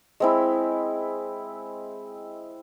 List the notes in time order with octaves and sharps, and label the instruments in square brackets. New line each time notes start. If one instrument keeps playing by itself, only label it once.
[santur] G#3 C4 E4